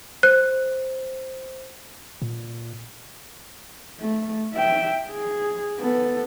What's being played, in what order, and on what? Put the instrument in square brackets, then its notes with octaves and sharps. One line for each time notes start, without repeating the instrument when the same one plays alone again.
[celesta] C5 [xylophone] F#6
[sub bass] A#2
[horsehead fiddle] A3
E5 G5
G#4
B3 A4